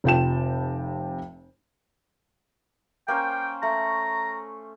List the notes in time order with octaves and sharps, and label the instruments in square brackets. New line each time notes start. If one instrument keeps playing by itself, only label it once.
[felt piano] F1 C3 F4 G5 A5 E7
[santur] A#3 C#4 C5 [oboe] G5
[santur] A3 [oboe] A#5